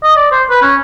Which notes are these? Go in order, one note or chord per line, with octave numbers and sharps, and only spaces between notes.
D#5
D5
C5
B4
C#4